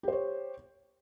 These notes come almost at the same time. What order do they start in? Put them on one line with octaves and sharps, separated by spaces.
G4 C5 C#5